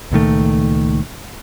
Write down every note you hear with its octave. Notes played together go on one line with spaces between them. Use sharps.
C#2 A#2 D#3 A3